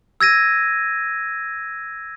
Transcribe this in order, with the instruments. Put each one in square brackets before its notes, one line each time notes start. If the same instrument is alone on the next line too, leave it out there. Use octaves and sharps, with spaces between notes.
[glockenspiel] E6 G#6 A#6 D#7